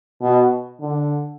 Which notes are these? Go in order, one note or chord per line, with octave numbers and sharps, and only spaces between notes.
B2
D3